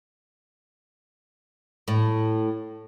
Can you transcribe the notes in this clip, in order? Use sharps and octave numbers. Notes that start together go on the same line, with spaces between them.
A2